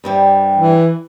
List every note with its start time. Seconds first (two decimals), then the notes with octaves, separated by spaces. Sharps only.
0.04 G2 C3 G3
0.56 E3